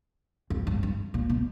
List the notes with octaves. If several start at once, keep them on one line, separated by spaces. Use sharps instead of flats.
F2
G2
G2
A#2
B2